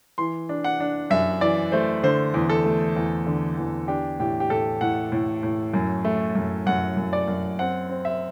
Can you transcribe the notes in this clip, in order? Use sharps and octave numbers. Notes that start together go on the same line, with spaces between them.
E3 C6
D4
F#5
D4
F#2 E5
E3 D5
A3 C5
D3 C5
E2
A4
A3
E2
D3
E2
D4 G4
A2 G4
G4
A2 A4
A2 F#5
A2
A2
F#2
A3
F#2
F#2 F#5
F#2
D5
F#2
C4 F#5
C4
E5